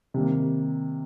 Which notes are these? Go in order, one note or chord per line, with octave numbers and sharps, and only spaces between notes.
C3 D#3 G3 A#3